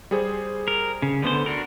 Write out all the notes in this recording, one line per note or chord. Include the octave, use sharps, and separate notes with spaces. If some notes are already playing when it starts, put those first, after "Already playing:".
G3 G#4 C5
A#4
C#3
D2 D3 B3 C5
D4 F#4 A#4